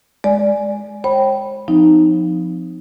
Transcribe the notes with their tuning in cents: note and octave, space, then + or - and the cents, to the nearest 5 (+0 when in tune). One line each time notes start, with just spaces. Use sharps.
G#3 +0 D5 +0 G#5 +0
C5 +45 G5 -10 B5 +0
F3 +0 C4 -40 D#4 +0